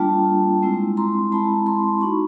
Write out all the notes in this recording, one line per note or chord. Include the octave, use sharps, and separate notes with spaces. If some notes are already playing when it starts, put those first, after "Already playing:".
Already playing: G3 A#3 D4 F4 G5 A5
G#3 C4 E4
A#5 C6
G#3 C4 E4 A5 B5
A#5 C6
A#3 D#4 F#4 B5 C#6